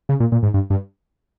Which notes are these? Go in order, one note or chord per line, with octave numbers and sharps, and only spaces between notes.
C#3
A#2
A#2
G#2
G2
G2